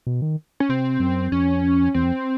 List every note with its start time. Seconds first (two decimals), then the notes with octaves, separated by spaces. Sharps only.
0.07 B2
0.22 D#3
0.60 C#4
0.69 C3 C4
1.00 F#2
1.32 F2 C#4
1.94 E2 C4
2.05 F2